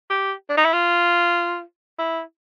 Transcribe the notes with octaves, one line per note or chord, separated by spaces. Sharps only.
G4
D4
D#4
E4
F4
E4